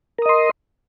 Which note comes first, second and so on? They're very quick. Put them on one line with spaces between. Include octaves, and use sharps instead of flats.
A#4 D#6 D#5 C6